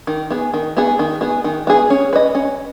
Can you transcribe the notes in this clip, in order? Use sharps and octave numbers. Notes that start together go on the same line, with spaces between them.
D#3
B3 G#4
D#3
B3 G#4
D#3
B3 G#4
D#3
B3 G#4
C#4
B4 D#5
C#4